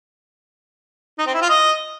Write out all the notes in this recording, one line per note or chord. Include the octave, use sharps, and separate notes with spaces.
D#4
C4
E4
F4
D#5